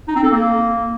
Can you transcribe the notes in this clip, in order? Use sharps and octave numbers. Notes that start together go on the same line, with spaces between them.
D#4
C4
A4
A#3